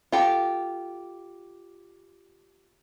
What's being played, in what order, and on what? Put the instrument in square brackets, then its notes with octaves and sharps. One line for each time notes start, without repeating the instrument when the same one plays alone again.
[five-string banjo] F4 G4 A4